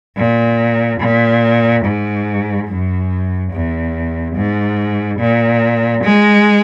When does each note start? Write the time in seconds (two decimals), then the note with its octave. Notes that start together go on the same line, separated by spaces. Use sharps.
0.17 A#2
1.00 A#2
1.85 G#2
2.68 F#2
3.52 E2
4.35 G#2
5.19 A#2
6.04 G#3